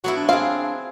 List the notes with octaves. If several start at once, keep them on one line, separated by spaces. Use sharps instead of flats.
F#3 B3 E4 F#4
D4
C4 G#4 F5